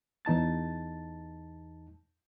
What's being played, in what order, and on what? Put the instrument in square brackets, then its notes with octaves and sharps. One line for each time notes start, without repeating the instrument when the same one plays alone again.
[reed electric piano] E2 D#4 A5 A6